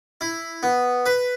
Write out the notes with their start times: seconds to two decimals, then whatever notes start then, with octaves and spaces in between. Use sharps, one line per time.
0.21 E4
0.63 B3
1.06 B4